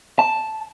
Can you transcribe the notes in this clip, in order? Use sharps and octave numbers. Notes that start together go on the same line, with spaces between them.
A5